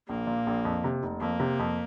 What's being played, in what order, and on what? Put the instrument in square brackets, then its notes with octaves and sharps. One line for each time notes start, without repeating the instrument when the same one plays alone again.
[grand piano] A#1 [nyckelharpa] A#3
[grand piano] A#2
A#1
F2
C3
F1
[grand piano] F2 [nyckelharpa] A#3
[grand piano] C3
F2